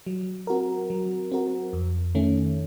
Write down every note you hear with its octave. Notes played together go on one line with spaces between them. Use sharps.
F#3
C4 F#4 A#4
F#3
C4 F#4 A#4
F2
D#3 A3 C#4